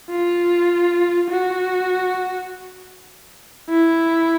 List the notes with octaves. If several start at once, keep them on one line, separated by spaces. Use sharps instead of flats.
F4
F#4
E4